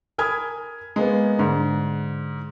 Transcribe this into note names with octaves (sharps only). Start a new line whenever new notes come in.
A#4 G#5 B5 D#6 F6 G#6
G#3 A#3 B3
G#2 D3